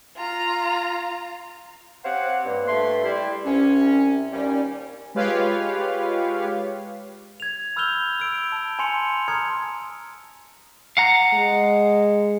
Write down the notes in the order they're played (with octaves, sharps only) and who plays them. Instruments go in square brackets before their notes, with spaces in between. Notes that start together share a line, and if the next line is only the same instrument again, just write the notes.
[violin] F4 A#5
[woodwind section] C4 G4 C5 C#5 F5 F#5
G2 A#3
G2 A3 B4 C6
G3 E4
C2 C3 C#4
D#2 G3 C#4
[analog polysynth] G#3 F4 G4 B4 C#5 F5
[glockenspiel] G#6 F7
B5 E6 F6 G6 F7 G7
E6 D7
A5
G#5 A5 C6 C#7 F7
A#5 C6 D#6 F6 G#6 C#7
[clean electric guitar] F5 F#5 A#5
[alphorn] G#3